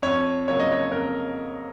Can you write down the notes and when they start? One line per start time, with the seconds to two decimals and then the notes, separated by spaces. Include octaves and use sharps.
0.02 F2 C#5
0.48 C#3 F#3 A#3 C#5
0.60 D#5
0.72 C#5
0.92 F2 A#4